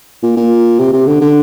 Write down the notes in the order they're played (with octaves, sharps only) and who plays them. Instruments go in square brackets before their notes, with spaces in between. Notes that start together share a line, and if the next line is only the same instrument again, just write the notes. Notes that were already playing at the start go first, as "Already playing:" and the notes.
[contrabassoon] A#2
A#2
C3
C3
D3
D3